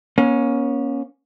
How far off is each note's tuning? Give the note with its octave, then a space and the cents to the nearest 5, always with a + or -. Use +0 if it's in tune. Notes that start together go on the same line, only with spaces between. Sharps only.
A#3 +45 C#4 +0